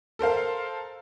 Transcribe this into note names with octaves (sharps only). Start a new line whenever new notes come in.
A4 A#4 C5 F5